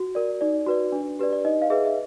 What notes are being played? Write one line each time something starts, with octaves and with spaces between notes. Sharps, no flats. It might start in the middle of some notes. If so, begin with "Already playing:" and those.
Already playing: F#4
A#4 D5
D#4 D5
F#4 B4 D5
D4
G4 B4 D5
D5
D#4 D#5
F5
G#4 B4 E5
E5